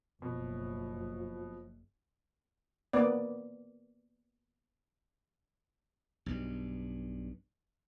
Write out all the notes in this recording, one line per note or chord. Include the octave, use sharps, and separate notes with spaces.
F#1 B2 F3
A#3 B3 D5
B1 G2